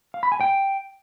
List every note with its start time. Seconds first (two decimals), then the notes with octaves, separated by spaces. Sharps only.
0.14 F5
0.23 B5
0.32 G#5
0.41 G5